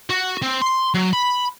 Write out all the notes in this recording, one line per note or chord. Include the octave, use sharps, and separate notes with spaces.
F#4
C4
C6
F#3
B5